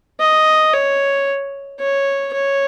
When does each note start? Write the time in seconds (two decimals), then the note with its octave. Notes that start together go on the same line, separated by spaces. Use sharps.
0.20 D#5
0.73 C#5
1.80 C#5
2.33 C#5